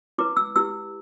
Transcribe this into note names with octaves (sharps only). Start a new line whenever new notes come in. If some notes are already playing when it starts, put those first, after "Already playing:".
E4 B4 D6
E6
E4 G4 B4 E6